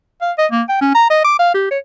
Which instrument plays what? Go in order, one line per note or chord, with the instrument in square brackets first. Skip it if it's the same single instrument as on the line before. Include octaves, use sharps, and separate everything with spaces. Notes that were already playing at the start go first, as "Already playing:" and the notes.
[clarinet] F5
D#5
A#3
G5
C#4
A#5
D#5
D6
F5
G4
C#5